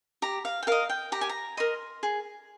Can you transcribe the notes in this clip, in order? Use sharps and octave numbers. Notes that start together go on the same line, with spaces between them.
G4 A#5
F5
G5
A#4 D#5 F5
G5
G4 A#5
G#5
A#5
A#4 D#5 C6
G#4